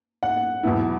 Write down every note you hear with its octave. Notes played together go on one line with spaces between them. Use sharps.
F#5
E2 B2 F#3 B3 E4